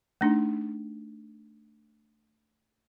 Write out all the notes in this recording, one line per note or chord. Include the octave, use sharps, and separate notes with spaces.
A3 D4 D#4